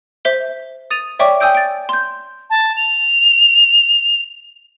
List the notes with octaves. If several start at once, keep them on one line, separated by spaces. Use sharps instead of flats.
C5 E5 B6 G7
D#6 A6 D#7 F7
C#5 D5 E5 G5 C#6 D6
G5 G#5 D#6 E6 G6 D7
A6 D7
C6 G6
A5
F7